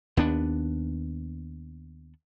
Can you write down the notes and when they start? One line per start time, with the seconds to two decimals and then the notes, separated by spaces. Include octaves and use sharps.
0.17 D#2 B3 D4